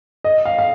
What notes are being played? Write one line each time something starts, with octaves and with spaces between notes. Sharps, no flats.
D#5
F5
F5